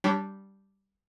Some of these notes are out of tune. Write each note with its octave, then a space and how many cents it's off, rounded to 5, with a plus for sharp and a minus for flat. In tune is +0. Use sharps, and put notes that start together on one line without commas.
G3 -5 D4 +0 C#5 +35